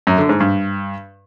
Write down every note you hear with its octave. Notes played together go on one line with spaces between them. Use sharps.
F#2
D3
G#2
G2